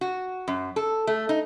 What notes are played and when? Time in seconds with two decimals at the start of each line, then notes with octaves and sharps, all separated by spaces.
0.01 F#4
0.48 F#2
0.76 A4
1.07 A3
1.29 D#4